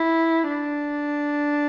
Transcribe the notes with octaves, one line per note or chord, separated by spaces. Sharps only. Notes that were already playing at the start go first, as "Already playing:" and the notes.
Already playing: E4
D4